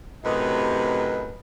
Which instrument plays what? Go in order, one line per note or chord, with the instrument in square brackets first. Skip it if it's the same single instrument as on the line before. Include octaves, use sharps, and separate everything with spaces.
[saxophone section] F#2 A2 C3 [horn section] B4 D#5